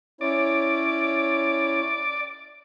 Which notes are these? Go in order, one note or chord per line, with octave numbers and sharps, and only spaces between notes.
C#4 E4 C#5 D5